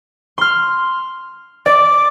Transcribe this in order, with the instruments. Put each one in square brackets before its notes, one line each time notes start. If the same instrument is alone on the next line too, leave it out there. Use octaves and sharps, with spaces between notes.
[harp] C6 F6
[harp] D5 [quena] D6